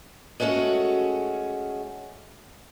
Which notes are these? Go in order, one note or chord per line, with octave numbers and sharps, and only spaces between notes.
G#3 A3 C#4 E4 F#4